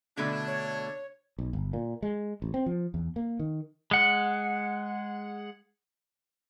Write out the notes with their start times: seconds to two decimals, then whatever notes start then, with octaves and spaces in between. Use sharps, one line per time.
0.17 B2 D3 A3 D4 G#6
0.47 C#5
1.39 B1
1.53 G1
1.73 A#2
2.02 G#3
2.42 A1
2.54 C4
2.66 F3
2.94 E2
3.16 A#3
3.39 D#3
3.91 G#3 F#5